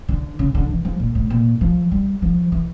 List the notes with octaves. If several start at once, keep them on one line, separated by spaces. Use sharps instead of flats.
D3
C#3
D3
E3
F3
A#2
A2
A#2
F3
G3
F3
E3